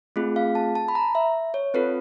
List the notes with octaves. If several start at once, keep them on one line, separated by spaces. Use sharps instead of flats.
A3 C4 F4 G#4
F5
A5
A5
B5
A#5
E5
C#5
C4 F4 A4 B4